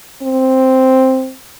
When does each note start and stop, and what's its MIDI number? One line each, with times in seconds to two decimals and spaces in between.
0.22 1.34 60